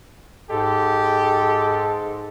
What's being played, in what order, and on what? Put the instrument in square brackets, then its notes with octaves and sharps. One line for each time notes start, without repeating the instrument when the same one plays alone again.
[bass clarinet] G#2 [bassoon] G#3 [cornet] G4 [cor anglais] A4